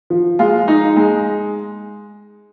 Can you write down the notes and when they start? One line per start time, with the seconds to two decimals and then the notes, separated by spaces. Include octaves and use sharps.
0.10 F3
0.39 G#3 F4
0.68 D#4
0.97 G#3